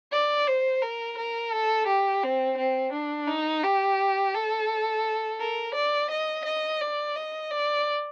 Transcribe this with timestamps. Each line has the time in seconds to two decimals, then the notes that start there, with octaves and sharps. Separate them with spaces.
0.12 D5
0.47 C5
0.82 A#4
1.18 A#4
1.53 A4
1.87 G4
2.23 C4
2.58 C4
2.93 D4
3.28 D#4
3.63 G4
4.35 A4
5.40 A#4
5.74 D5
6.10 D#5
6.45 D#5
6.81 D5
7.16 D#5
7.51 D5